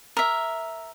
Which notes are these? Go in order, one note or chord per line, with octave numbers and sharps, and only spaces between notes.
A#4 E5